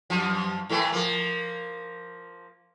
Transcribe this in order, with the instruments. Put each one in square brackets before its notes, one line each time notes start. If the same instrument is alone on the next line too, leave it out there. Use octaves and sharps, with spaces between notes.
[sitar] F#2 F3
A2 E3 A3
F3 A#3